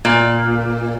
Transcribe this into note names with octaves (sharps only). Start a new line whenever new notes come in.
A#2